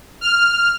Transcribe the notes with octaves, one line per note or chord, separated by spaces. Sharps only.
F6